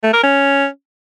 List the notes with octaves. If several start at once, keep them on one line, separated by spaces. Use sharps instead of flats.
A3
A#4
C#4